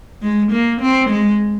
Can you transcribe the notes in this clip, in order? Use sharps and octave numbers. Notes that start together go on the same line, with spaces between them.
G#3
A#3
C4
G#3